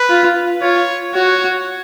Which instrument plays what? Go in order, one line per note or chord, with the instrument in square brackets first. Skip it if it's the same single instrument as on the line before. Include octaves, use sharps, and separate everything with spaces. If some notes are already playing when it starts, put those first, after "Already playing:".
Already playing: [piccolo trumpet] B4
[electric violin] F4
[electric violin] F4 [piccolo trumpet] C#5
[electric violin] F#4 [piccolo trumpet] C#5